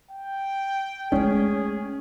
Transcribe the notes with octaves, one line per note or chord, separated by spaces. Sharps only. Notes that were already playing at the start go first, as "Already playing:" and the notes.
G5
G#3 A3 C#4 G#4